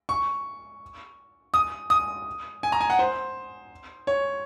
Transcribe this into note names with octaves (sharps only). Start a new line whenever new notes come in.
C#6
D#6
D#6
G#5
A#5
G#5
F#5
C5
C#5